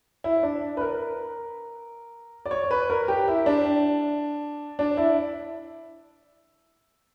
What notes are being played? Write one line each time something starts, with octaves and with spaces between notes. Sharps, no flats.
E4
D4
B4
A#4
D5
C#5
B4
A#4
G4
E4
D4
D4
E4